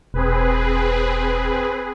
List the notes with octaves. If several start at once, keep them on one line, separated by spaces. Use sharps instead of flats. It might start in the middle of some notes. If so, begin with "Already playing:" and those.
E1 C4 G#4 B4